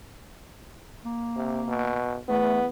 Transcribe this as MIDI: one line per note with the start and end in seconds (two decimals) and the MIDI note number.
1.05 2.03 58
1.36 1.62 48
1.68 2.18 47
2.29 2.67 40
2.29 2.59 57
2.29 2.66 59